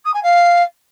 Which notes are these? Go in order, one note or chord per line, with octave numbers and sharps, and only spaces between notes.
D#6
G#5
F5